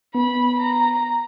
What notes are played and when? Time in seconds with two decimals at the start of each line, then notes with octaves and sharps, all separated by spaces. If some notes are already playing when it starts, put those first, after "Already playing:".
0.15 B3 B5
0.59 A#5